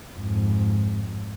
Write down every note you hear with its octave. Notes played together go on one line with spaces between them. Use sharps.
F2 G#2